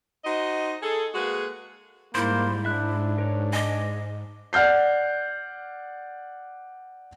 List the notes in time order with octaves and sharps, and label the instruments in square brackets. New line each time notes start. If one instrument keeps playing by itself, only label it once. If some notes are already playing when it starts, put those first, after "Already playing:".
[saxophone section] D#4 F#4 C5 D#5
G#4 A4
G#3 A#3 F#4 G#4 B4
[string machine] G#2 [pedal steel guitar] G3 C5 [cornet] A#3 [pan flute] E4
[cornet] D4 [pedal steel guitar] E5 F#6
[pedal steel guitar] A#4 C#5
[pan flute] D#5 [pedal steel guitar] G#5 D6
[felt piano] D5 F#5 F6 G6 C7